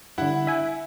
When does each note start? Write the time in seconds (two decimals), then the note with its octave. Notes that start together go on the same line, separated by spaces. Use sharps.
0.18 G2 D3 E4 F#5
0.47 E5 G#5